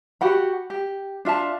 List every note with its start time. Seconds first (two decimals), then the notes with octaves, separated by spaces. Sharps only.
0.21 F#4 G4 F#5 B5
0.70 G4
1.25 D4 F4 E5 A5